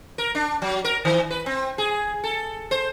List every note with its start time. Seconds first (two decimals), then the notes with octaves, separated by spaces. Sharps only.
0.18 A#4
0.35 D4
0.62 F#3
0.85 A#4
1.05 D#3
1.31 B4
1.46 C4
1.78 G#4
2.24 A4
2.71 C5